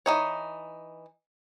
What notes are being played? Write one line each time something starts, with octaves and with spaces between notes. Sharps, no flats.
E3 F#3 D#4 C#5